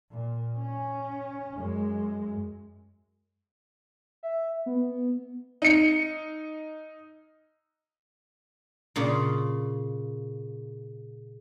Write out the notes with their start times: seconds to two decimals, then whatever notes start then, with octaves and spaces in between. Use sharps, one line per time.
0.11 A#2
0.58 C#4
1.57 F#2 G#3
4.23 E5
4.66 B3
5.62 D#4 C#7
8.96 A#2 C#3